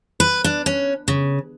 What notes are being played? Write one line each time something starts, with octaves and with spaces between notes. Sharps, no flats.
B4
D4
C#4
C#3